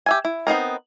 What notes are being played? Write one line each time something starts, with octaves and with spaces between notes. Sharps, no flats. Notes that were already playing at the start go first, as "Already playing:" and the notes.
G4 E5 G#5
E4
B3 C4 D#4 A#4